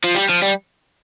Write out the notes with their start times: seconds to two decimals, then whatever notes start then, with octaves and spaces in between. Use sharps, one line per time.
0.04 F3
0.16 G3
0.30 F3
0.43 G3